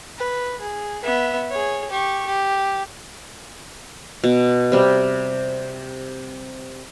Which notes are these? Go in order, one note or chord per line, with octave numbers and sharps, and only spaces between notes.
B4
G#4
B3 E5
G#4 C#5
G4 C#6
G4
B2
C3 G3